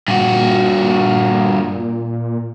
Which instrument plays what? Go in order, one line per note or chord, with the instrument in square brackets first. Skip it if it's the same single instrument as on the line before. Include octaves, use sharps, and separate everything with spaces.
[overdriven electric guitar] G2 F#4 [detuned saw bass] A#2